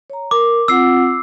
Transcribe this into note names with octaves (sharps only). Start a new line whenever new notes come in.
C#5 A#5
A#4 D6
C4 F4 F#5 E6 C7